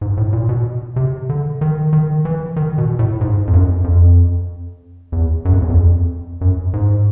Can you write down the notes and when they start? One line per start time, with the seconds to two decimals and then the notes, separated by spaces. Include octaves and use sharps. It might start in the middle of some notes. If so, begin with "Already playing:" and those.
0.01 G#2
0.17 A2
0.33 A#2
0.49 B2
0.96 C3
1.29 D3
1.61 D#3
1.93 D#3
2.25 E3
2.56 D#3
2.78 B2
2.99 A2
3.21 G#2
3.47 F2
3.53 F#2
3.84 F2
5.12 E2
5.45 F#2
5.53 F2
5.62 E2
5.70 F2
6.41 F#2
6.73 G#2